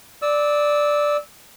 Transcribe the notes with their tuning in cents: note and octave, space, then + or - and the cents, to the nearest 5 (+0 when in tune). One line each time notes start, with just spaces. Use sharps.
D5 +0 E6 -20